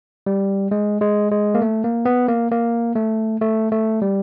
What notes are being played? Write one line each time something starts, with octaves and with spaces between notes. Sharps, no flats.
G3
G#3
G#3
G#3
A#3
A3
A#3
B3
A#3
A#3
A3
A3
A3
G3